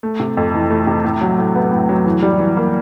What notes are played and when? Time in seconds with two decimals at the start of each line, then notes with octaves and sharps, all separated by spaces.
0.03 A3
0.20 C3
0.37 F2
0.54 E3
0.70 A3
0.87 C3
1.05 A2
1.21 F#3
1.38 A2
1.55 B3
1.72 A2
1.89 F#3
2.05 E3
2.22 G3
2.39 E3
2.57 A#3